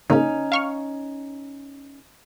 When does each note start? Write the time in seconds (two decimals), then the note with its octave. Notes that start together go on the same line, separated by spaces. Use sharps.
0.10 C#3 A#3 C#4 D#4
0.52 F5 C#6 F6